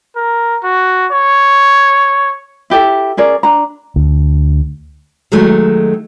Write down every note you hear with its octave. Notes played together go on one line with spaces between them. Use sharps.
A#4
F#4
C#5
E4 G4 A4 E5
C#4 G#4 A#4 D5
D4 A#5
D2
D#3 F#3 G#3 A3